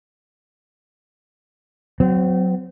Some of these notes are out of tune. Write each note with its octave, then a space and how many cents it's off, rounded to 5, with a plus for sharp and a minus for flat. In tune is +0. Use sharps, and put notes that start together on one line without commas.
F#3 +0 C4 -30